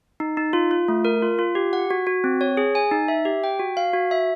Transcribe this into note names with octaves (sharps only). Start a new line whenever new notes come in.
D#4
D#4
F4
F4
A3
A#4
F4
F4
G4
F#5
F#4
F#4
C4
C#5
G#4
G#5
D#4
E5
G4
G5
F#4
F5
F#4
E5